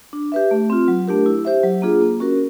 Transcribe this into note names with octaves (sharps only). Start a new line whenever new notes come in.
D4
G4 B4 E5
A3
C4 F4
F#3
A3 D4 G4 A#4
E4
G4 C5 E5
F#3
A#3 D4 F4 G#4
A#3
C#4 F#4 A#4